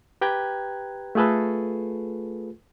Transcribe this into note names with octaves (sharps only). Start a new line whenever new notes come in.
G4 B4 G5 A#5 F#6 G#6
A3 F4 G#4 A4 B4